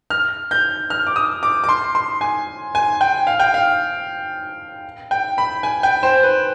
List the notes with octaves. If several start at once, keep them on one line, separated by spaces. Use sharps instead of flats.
F6
G6
F6
D6
D#6
D6
D6
C6
C6
G#5
G#5
G5
F5
G5
F5
G5
B5
G#5
G5
C5
B4